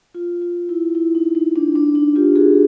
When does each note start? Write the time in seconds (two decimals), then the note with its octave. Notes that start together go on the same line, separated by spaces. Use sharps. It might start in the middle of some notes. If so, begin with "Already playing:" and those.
0.14 F4
0.42 F4
0.69 E4
0.95 E4
1.15 D#4
1.35 D#4
1.56 D4
1.75 D4
1.95 D#4
2.16 F4 G4
2.36 F#4 G#4